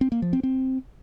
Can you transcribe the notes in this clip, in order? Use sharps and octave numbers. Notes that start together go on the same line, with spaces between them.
C4
A#3
F3
C4
C4